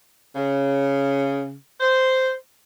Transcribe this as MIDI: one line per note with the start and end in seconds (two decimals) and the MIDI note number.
0.36 1.54 49
1.80 2.33 72